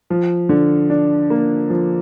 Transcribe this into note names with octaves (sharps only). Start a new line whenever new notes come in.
F3
D3
D4
A#3
F3